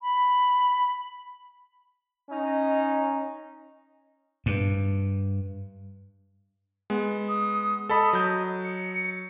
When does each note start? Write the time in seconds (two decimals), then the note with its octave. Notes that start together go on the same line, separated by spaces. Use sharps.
0.01 B5
2.30 C#4 D#4 D#5
4.46 G2
6.90 G#3 B3
7.28 D#6
7.89 A4 D#5 A5 B5
8.13 F#3 G6
8.64 C#7